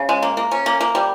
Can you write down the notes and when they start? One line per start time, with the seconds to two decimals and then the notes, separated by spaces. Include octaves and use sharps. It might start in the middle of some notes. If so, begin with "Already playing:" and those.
Already playing: C#3
0.09 G#3
0.22 A#3
0.37 A#3
0.51 C#4
0.66 A#3
0.81 A#3
0.95 G3